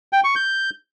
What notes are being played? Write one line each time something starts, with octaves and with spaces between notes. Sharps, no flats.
G5
C#6
G6